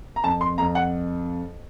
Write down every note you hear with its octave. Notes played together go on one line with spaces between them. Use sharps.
A#5
F2 A5
C6
F2 A#5
F#5